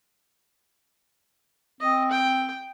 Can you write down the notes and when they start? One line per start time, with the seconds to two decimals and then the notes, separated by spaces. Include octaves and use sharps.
1.81 C4 D#5
2.11 G5